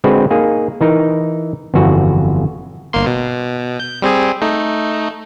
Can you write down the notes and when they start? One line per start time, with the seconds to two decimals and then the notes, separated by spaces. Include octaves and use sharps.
0.04 D3 G#3 C4 F#4 B4
0.31 A#3 D#4 G#4
0.81 E3 D#4 A#4
1.74 G1 F2 E3 C#4 F#4
2.93 G1 A#3 C6
3.06 B2
3.80 G6
4.02 G3 C4 G#4
4.41 A3 D#4